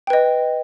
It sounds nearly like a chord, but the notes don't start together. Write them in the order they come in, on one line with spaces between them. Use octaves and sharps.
G5 B4 D#5